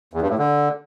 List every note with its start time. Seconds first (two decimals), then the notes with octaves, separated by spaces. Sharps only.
0.13 E2
0.22 G2
0.30 A2
0.38 D3